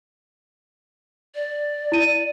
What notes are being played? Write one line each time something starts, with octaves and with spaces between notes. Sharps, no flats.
D5
E4 D#7